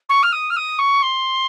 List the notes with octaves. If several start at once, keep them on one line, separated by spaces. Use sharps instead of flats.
C#6
F6
D#6
F6
D#6
C#6
C6